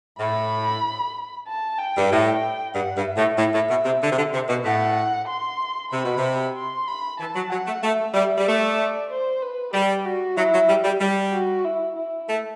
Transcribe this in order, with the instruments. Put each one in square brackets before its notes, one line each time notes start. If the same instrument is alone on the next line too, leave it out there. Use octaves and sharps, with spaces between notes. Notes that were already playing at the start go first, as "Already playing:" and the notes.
[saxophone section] A2 [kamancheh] B5
[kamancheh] A5
G5
[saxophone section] G2
[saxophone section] A2 [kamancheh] G5
[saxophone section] G2 [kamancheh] F#5
[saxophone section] G2
[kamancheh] E5
[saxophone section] A2
A2
A2
B2
C3
D3
C3
D3
C3
B2
[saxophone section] A2 [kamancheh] F#5
[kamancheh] C6
[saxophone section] C3 [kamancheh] B5
[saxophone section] B2
C3
[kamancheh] C6
B5
[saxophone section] E3 [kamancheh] A5
[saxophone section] F#3
[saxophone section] F#3 [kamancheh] F#5
[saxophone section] A3
[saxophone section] A3 [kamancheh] E5
[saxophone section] G3 [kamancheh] E5
[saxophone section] G3
[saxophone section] A3 [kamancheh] D5
[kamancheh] C5
B4
[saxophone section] G3 [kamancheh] G4
[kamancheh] F#4
[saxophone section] F#3 [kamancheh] E4
[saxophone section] F#3
G3
G3
G3
[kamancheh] F#4
E4
E4
[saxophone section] A3